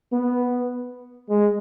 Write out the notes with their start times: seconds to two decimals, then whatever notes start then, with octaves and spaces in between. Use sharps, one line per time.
0.12 B3
1.29 G#3